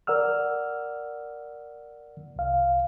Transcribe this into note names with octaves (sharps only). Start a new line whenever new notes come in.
A#4 D5 F#5 E6 F6
C2 F5